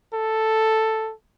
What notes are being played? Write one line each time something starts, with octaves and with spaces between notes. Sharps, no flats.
A4